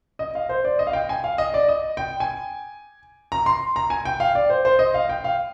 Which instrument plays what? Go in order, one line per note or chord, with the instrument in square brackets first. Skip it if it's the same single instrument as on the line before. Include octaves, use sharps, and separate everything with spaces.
[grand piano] D#5
F5
C5
D5
D#5
F5
G5
G#5
F5
D#5
D5
D#5
G5
G#5
A#5
C6
A#5
G#5
G5
F5
D5
C5
C5
D#5
F5
G5
F5